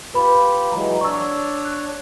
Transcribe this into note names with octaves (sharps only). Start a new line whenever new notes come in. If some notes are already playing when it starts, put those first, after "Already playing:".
F4 G4 B4 B5
E3 F#3 G#3 A#5
D4 C#5 D5 C#6 E6
F#6